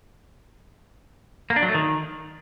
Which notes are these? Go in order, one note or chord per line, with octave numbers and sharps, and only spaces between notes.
A#3
D4
F#3
A3
D#3